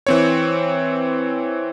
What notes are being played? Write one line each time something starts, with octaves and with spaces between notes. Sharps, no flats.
E3 C4 C#5